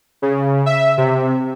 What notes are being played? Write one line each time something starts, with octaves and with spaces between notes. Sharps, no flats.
C#3
E5
C3